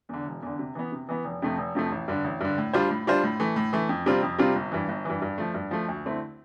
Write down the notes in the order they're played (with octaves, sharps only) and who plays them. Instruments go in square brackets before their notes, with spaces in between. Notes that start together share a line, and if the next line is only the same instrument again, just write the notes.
[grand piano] E2 D3
E1
E2 D3
C3
E3 B3
C3
E3 B3
F1
F2 C3 F3 A3
F1
F2 C3 F3 A3
A1
G2 D3
A1
G2 D3
A2
G3 D4 F4 C5
A2
G3 D4 F4 C5
A2
E3 A3
A2
E3 A3
F2
C3 G3 C4 F4
F2
C3 G3 C4 F4
G1
G2 E3
G1
G2 E3
G2
F3 A3
G2
F3 A3
D2
D3 A3 C4 E4